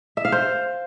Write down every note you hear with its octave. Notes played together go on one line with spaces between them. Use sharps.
E5
F5
C5